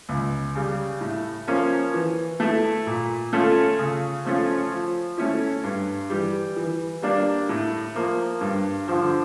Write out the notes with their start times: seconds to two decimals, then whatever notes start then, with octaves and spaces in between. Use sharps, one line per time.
0.09 C#2
0.55 C#3 G3
1.01 A2
1.47 F3 A#3 C#4
1.94 E3
2.40 A3 E4
2.87 A#2
3.33 A3 C#4 F4 A4
3.79 C#3
4.25 F3 A3 C#4 F4
4.71 F3
5.18 A3 C#4 E4
5.64 G2
6.10 E3 G3
6.56 E3
7.02 G3 A#3 D4
7.49 A2
7.95 F3 A#3
8.41 G2
8.88 D3 F3